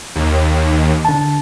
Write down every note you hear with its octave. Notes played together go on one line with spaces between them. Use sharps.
D#2
D3 A5